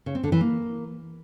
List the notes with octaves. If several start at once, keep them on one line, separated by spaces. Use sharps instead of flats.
C#3
C4
D3
E3
A#3